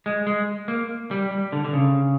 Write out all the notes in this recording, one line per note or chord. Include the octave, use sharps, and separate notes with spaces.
G#3
G#3
A#3
G3
G3
D3
D3
C#3